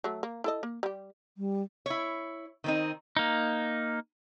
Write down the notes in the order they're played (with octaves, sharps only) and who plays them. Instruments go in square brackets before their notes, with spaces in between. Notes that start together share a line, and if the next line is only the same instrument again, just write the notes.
[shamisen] F#3 A3
A#3
E4 A4 D#5
A#3
G3 G4
[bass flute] G3
[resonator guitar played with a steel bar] E4 C#5
D#3 C4 D#4
[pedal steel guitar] A#3 D#4